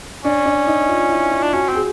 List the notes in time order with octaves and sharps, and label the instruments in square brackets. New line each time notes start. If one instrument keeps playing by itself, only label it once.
[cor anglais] C#4 [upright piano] D4
[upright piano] D4
D#4
F4
E4
F4
[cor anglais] D4
[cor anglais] C#4 [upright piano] F#4
[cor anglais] C4
[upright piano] G#4